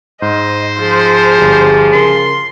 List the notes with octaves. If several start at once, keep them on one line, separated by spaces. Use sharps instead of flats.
G#2 C5 D#5
F3 G#4
G1 G4
C#3 A#4 C6